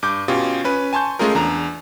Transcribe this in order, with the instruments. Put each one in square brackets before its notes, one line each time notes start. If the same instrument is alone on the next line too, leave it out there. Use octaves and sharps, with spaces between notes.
[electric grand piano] G2 D6 G6
B2 C#4 F4 G4
C#4 B4
G#5 A5 C6 C#6 G6
G#3 A3 C#4 F4 G#4 A#4
E2 D4 A#5